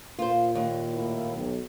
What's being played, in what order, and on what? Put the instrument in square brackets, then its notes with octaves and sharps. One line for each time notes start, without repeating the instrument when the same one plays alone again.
[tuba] A#2 [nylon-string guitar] F4 C5
[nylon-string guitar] D#2
[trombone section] A2 A#3 E4
B1